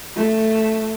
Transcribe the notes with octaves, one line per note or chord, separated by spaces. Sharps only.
A3